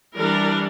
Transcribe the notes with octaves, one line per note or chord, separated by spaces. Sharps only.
E3 G3 D4 A#4